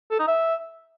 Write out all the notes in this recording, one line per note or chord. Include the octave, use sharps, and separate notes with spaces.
A4
D#4
E5